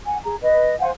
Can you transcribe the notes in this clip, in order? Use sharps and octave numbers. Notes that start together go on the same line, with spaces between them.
F#5 G#5
G#4 A#5
B4 D#5
C5 F5 F#5 G#5